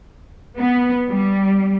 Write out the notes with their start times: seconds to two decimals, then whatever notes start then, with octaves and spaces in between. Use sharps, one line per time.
0.58 B3
1.09 G3